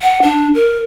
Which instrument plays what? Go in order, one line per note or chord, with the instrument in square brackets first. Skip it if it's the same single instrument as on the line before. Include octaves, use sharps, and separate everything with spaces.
[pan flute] F#5
D4
A#4